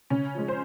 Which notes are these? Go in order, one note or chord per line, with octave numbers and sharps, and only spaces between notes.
C#3 C#4
F3 G#3
C5